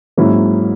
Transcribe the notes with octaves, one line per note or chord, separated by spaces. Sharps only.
G#2 F#3 A#3 C#4 E4